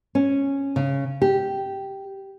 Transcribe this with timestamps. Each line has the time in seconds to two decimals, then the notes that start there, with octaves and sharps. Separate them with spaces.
0.15 C#4
0.76 C#3
1.22 G4